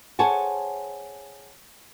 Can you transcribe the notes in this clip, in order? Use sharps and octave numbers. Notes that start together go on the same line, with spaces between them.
G#4 C5 C#5 F#5 G#5 A5